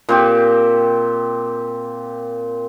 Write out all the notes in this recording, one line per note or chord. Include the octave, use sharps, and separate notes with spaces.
A#2 C4 G4